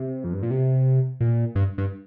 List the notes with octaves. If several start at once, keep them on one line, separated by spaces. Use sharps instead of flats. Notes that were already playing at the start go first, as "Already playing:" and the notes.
Already playing: C3
F2
G2
A#2
C3
A#2
G2
G2